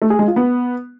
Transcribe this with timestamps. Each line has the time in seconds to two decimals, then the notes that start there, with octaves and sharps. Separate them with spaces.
0.02 A3
0.10 G#4
0.19 G#3
0.28 F4
0.36 B3